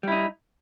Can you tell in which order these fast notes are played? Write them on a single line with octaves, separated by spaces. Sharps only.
G3 E4 D#4